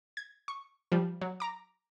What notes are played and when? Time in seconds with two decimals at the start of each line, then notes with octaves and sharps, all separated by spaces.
0.17 G#6
0.48 C#6
0.92 F3 G3
1.22 F#3
1.40 A#5 D6